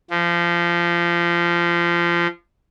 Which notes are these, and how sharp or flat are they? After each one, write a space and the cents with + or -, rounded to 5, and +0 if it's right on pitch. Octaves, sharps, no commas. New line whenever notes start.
F3 -25